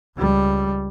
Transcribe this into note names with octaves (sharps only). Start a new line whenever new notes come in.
C#2 G3